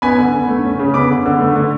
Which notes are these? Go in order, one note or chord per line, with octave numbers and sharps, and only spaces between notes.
B3 G#5 B5
D3
D3
A3
C#4
C#3
B3 B5 D6
D3
D3
A3
D3